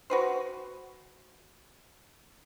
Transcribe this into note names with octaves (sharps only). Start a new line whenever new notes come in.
F#4 B4 C5